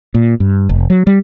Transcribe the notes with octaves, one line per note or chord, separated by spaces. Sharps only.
A#2
G2
F1
F#3
G3